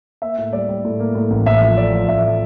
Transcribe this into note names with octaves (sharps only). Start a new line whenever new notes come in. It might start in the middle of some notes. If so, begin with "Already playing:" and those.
A#3 E5
A2
G3 D5
G3
A2
A#3
A2
A1
A1 E5
F3
A3 D5
F3
A1 E5
F3